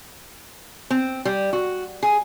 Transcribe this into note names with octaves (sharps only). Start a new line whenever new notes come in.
C4
G3
F#4
G#4